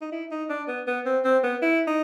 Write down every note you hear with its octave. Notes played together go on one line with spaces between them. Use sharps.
D#4
E4
D#4
D4
B3
B3
C4
C4
B3
E4
D#4